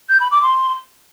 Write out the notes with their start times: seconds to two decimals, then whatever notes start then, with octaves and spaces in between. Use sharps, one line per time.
0.09 G6
0.20 B5
0.31 D6
0.43 C6